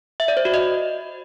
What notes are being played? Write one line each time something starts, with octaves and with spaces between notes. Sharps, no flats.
E5
D5
C5
F#4
D#5